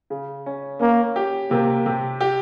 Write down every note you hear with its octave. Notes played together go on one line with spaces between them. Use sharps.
C#3
C#4
A#3 C#4
G4
C3 A#3
C3
G4